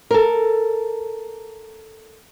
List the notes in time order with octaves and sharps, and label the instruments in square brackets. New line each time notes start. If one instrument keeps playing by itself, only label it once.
[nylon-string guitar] A4 A#4